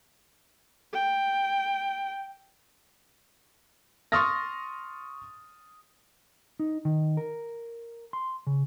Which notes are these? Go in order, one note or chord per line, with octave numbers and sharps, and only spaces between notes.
G5
C6 C#6 D#6 F6 A6 A#6
D#4
D#3
A#4
C6
C#3